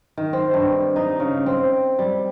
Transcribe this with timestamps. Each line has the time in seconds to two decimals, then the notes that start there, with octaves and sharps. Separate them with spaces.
0.17 D#3
0.33 C4
0.54 G2
0.96 D#4
1.20 C#3
1.46 C4
1.99 G3